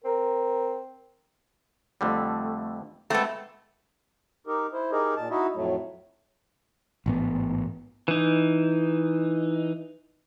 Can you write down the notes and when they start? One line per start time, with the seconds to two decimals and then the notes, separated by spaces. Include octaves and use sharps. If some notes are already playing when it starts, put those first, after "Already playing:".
0.04 C4 A#4
2.01 F2 D3 G3 A3
3.10 G#3 A3 B3 C4 A4
4.47 D#4 G4 A#4
4.73 E4 C5
4.92 D#4 G4 G#4 A#4 D#5
5.17 A#2 A5
5.30 D#4 E4 F#4 D#5 E5
5.55 F2 A2 F#3 A3
7.06 A1 G#2 B3
8.08 E3 D#4